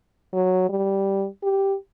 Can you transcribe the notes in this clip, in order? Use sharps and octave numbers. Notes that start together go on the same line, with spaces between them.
F#3
G3
G4